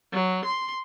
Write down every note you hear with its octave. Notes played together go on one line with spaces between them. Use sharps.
F#3
C6